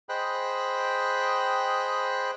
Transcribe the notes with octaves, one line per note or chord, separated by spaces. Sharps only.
G#4 C5 D#5 G5 B5 F#6